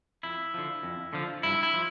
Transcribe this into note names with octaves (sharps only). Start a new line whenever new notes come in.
F2 E4
D3 F3
F2
D3 F3
G2 E4
E4
F3